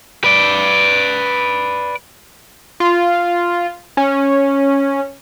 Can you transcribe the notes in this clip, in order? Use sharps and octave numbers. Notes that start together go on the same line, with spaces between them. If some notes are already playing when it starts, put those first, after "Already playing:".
B4 D5
F4
C#4